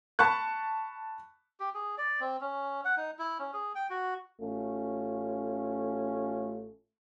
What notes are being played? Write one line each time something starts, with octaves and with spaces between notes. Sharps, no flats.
A5 B5 C#6 F#6
G4
G#4
D5
C4
C#4
F#5
D#4
E4
C#4
G#4
G5
F#4
A1 A3 C#4 F4